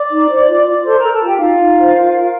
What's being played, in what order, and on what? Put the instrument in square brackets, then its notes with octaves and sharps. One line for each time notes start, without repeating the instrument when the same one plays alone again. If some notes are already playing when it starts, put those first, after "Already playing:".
Already playing: [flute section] D5 D6
D#4
C5
F4
F4
A4 C5 C6
A4 A#4 A#5
A4 A5
F4 G4 G5
D#4 F4 F5
D#4
C5
A#4
A#4